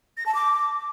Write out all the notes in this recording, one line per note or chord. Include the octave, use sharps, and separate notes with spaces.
A#6
A5
D6